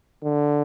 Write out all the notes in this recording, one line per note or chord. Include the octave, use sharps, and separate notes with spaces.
D3